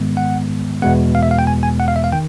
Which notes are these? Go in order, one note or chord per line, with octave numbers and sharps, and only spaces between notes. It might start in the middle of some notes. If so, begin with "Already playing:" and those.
Already playing: G#2 D#3 G#3 B3
F#5
E2 B2 G#3 B3 F#5
F5
E5
F5
G5
G#5
G#5
F#5
F5
E5
F5
D#3 G5